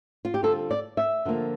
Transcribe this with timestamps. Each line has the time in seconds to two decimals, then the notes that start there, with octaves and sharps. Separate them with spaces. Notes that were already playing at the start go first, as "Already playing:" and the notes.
0.25 F4
0.34 G4
0.43 D3 G3 C4 F4 A4
0.71 D5
0.97 E5
1.25 D3 F3 A#3 F4